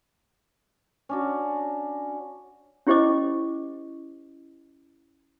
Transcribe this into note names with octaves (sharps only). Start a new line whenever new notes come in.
C#4 D4 F#4
C#4 E4 G4 C5 D#5 D6